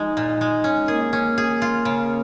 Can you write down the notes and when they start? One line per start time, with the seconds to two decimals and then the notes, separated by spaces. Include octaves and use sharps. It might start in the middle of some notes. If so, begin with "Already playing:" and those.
Already playing: F3 G#3 D#4
0.17 A#2
0.41 G#3
0.64 C#4
0.88 A#3 G#4
1.13 C#4
1.38 G#4
1.62 F4
1.85 C#3